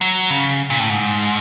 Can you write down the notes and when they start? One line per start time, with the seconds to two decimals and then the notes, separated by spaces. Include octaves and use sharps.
0.01 F#3
0.30 C#3
0.70 A#2
0.80 A2
0.90 G#2